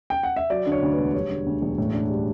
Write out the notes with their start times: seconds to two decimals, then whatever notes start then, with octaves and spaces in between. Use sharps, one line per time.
0.10 G5
0.23 F#5
0.36 E5
0.50 F#3 D5
0.66 D3
0.72 C#5
0.82 D2
0.93 B4
0.98 E1
1.14 G3 C#5
1.30 D3
1.46 D2
1.62 E1
1.78 A2
1.94 D4
2.10 G3